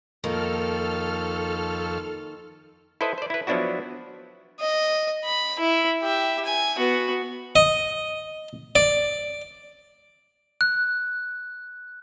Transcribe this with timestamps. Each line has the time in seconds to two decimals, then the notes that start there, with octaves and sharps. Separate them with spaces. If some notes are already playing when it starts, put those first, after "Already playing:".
0.24 F2 D#3 F3 A#3 A4 C#6 F6
3.01 E4 A4 B4 C5 D#5
3.18 C5 D5
3.30 E4 B4
3.47 F3 F#3 B3 D4 E4 F#4
4.60 D#5
5.25 B5
5.60 E4
6.03 G4 E5
6.45 G#5
6.78 B3 F#4
7.56 D#5
8.75 D5
10.61 F#6